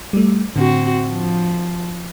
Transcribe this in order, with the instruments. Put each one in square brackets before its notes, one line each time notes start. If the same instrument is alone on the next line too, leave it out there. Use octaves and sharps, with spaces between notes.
[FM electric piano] G3 A3
[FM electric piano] A2 D3 [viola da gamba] C4 F#4
[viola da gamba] F3